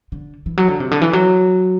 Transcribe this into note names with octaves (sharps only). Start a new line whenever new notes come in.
D3
E3
F#3
D3
C3
D3
E3
F#3